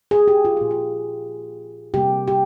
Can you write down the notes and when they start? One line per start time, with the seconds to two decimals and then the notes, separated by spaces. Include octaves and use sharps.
0.11 G#4
0.28 G4
0.45 F4
0.57 A#2 F3 A#3 G4
0.71 F4
1.94 C3 G3 A#3 G4
2.28 G4